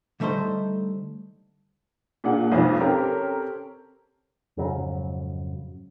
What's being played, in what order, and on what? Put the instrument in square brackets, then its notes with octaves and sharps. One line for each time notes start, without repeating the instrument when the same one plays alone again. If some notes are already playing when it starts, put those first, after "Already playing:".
[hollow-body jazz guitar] D3 G3 A3 D#4 C5
[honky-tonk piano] A#2 A#3 D4 G#4 F#5
B1 F2 G#2
C4 C#4 G4 A4 A#4
[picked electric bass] F2 G#2 C#3 F#3